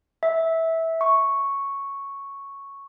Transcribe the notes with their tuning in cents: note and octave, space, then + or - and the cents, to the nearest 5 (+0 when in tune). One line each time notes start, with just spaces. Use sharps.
E5 -15
C#6 +0